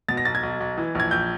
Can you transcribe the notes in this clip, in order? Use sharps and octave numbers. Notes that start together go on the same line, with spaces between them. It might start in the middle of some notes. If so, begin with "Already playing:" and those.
B2 A6
A#6
B1 A6
G#6
B1
B1
E3
A#1 G#6
A#1 G6